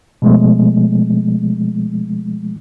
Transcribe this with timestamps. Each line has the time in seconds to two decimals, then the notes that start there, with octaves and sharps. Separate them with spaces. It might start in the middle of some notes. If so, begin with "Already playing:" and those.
0.22 B2 F3 G#3 A3 B3